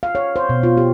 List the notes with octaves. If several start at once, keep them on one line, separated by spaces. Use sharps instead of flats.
F5
C#5
C5
B2
F4
G4